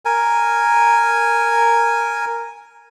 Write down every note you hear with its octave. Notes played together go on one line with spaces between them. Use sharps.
A#4 G#5